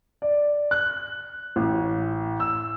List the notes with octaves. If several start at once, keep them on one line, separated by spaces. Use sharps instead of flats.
D5
F#6
A1
E6